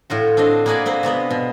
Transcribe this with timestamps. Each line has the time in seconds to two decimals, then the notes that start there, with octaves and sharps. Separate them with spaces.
0.10 A2 F4 F#4
0.37 C4 D4 C5 D#5
0.66 A#3 F#4 G#4 B4 D5 G#5
0.86 A#3 C4 B4 C5
1.03 C3 G#3 B3 B4
1.30 B2